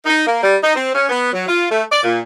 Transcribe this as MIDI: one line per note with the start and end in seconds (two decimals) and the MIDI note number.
0.06 0.27 63
0.27 0.40 58
0.43 0.56 55
0.64 0.73 63
0.75 0.91 60
0.95 1.06 61
1.09 1.31 59
1.33 1.46 54
1.48 1.70 65
1.71 1.83 57
1.91 2.02 74
2.03 2.19 46